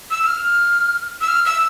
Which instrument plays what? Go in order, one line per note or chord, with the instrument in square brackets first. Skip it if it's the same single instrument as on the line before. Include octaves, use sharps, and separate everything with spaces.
[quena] E6
E6
F6
E6
F6
E6